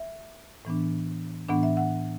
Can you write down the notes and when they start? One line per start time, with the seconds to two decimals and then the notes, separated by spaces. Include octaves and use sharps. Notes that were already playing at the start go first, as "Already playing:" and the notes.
Already playing: E5
0.65 A2 E3 B3 D4
1.49 A2 E3 B3 D4 F#5
1.63 E5
1.77 F#5